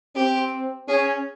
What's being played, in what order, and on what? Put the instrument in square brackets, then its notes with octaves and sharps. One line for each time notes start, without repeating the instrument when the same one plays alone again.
[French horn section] C4 [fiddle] G4
[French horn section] C#4 [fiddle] G#4